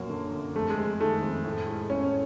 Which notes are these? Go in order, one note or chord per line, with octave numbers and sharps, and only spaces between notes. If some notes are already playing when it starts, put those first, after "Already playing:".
Already playing: F#2 A#2 F#3 A#3
D3
F#2
F2 A3
G#3
F2
D#3 A3
F2
A2
G#3
A2 C#4